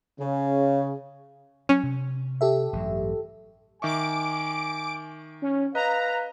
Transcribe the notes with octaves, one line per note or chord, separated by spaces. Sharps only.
C#3
F#3 C#4
C3
G4 A4 E5
A1 G2 F#3
D#3 E5 G#5 C#6 D6 D7
C#4
B4 D#5 F5 A#5